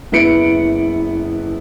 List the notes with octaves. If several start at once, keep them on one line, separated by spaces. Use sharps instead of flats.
F#1 B3 E4 B4 C#7 D7